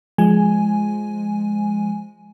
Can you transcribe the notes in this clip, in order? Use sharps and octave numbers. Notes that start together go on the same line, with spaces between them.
F3 G#3 G#5